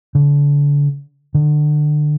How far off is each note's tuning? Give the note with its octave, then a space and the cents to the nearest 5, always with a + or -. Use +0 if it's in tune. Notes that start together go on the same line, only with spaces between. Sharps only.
D3 -35
D3 +30